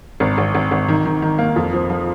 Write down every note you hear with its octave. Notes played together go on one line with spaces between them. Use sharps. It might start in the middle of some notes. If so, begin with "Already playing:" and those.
G#1
G#1
G#1
G#1
D#3
D#3
D#3
A#3
F2
F3
F3